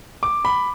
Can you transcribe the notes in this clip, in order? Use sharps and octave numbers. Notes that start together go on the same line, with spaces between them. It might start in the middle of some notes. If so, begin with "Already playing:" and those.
D6
B5